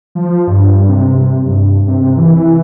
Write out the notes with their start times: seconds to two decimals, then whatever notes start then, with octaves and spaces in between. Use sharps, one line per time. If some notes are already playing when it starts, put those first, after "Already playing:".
0.15 F3
0.47 G2
0.89 C3
1.46 G2
1.87 C3
2.17 E3